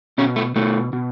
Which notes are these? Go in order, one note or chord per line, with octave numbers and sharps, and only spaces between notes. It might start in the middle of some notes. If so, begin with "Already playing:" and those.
B2 C#4
A3
B2 A3
B2